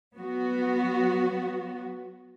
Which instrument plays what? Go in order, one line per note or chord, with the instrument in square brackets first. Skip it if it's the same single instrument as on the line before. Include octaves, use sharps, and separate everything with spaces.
[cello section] F#3 B3 F#4